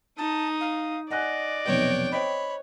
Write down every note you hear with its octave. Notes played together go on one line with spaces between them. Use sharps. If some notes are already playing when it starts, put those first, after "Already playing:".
D#4 A5 D#6
F5
D5 D#5 F#5 G#5 F#6
F1 B1 B3 C#5 G5
C5 C#5 D#5 G5 B5